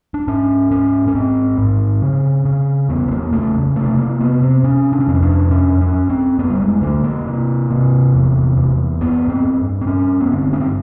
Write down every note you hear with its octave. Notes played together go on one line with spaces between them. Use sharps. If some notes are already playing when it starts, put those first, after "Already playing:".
D4
G#2 C#4
G#2 C#4
C#4
G#2 C4
G#2
C#3
C#3
E2 B3
B3
A#3
C#3 A3
C3 A3
A#3
C3 B3
C4
C3 C#4
D4
C#4
F2 C4
C#4
D4
F#2 C#4
C#4
F#2
C4
F#2 B3
G3
G#3
D3 A3
A#3
C3
C3
E2
E2
G2 B3
C4
G2
C4
G2 C#4
B3
D3 C4
C#4
C4